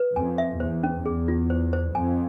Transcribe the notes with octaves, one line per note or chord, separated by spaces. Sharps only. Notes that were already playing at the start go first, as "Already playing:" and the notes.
Already playing: B4
F2 G#5
E5
E2 C5
C#4
E2 G#4
F4
C5
C5
F2 G#5